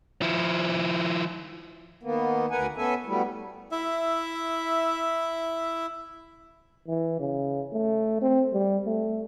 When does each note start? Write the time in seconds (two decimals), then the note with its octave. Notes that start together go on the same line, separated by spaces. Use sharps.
0.22 F3 E4
2.03 D#3 A#3 B3
2.51 D2 A#4 B4 F#5 G#5
2.77 B3 C#4 A4 E5 G#5
3.06 F#3 G3 A3 B3 E4
3.72 E4 E5
6.88 E3
7.20 C#3
7.73 A3
8.22 C4
8.53 G3
8.86 A3